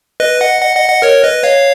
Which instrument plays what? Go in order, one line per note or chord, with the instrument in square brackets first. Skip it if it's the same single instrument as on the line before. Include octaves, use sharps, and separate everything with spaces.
[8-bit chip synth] B4 D#5
D#5 F#5
D#5 F#5
D#5 F#5
D#5 F#5
A#4 C#5
B4 D#5
C#5 F5